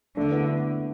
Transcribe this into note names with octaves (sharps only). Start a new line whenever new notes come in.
D3 A3 D4
B3 E4